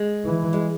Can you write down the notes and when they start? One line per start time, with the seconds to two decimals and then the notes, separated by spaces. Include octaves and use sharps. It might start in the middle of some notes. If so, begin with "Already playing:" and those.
Already playing: G#3
0.25 E3
0.53 G#3